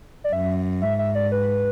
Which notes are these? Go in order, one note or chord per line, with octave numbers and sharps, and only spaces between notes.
D5
F#2 E5
G#2 E5
E5
D5
B4